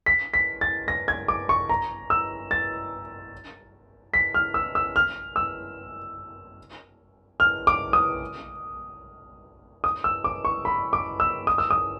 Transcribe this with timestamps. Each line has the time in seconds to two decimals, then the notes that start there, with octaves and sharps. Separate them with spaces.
0.06 B6
0.34 B6
0.61 A6
0.88 A#6
1.08 G#6
1.28 D6
1.49 C#6
1.69 A#5
2.10 E6
2.51 A6
4.14 B6
4.34 F6
4.54 E6
4.75 E6
4.96 F6
5.36 E6
7.40 F6
7.67 D6
7.93 D#6
9.84 D#6
10.04 E6
10.24 D6
10.45 C#6
10.65 B5
10.93 D6
11.20 E6
11.47 D#6
11.58 E6
11.71 D#6